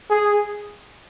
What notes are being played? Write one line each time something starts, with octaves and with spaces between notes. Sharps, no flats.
G#4